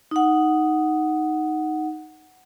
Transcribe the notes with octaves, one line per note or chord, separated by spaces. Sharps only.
D#4 F#5